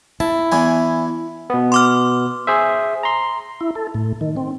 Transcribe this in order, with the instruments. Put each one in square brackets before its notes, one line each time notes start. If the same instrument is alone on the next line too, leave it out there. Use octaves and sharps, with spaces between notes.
[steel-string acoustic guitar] E4 [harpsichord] A5
[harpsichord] E2 E3 G#5
[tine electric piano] B2 B3
[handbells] C6 D6 F6
[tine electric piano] G#4 C5 E5
A#5 C6
[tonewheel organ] E4
A4
A2
D#3
C4